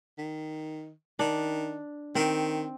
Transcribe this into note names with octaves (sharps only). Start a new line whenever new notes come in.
D#3
D#3 D4
D#3 C4